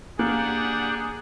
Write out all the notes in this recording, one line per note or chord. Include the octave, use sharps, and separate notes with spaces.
A#3 D4 G4 G#4 F#5